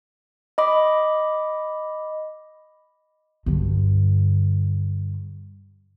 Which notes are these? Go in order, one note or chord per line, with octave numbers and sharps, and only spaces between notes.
D#5 B5 D6
G2 D3